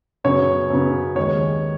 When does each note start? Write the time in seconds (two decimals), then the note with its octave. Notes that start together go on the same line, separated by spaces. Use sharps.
0.24 F#2 C#3 B3 C#5
0.70 F#2 C#3 B3
1.16 D#2 D#3 G#3 B3 C#5